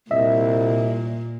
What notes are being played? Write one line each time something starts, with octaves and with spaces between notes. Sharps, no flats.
C2 A#2 D#5 E5